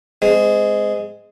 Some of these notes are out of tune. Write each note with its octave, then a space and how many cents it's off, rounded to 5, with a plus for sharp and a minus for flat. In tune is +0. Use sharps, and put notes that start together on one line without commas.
G#3 +0 C4 -30